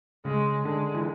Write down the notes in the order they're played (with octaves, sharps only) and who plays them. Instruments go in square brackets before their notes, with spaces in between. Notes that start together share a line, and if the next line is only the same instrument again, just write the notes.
[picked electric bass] C#3 [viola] G#3
[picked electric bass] D3 [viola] G#3
[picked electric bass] E3